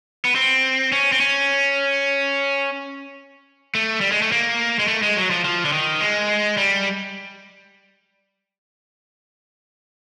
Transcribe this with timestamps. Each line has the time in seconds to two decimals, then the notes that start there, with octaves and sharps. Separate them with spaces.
0.25 B3
0.35 C4
0.92 C#4
1.12 C4
1.21 C#4
3.75 A3
4.01 G3
4.12 G#3
4.22 A3
4.32 A#3
4.79 G#3
4.88 A3
5.03 G#3
5.17 F#3
5.31 F3
5.45 F3
5.65 D3
5.73 D#3
6.01 G#3
6.57 G3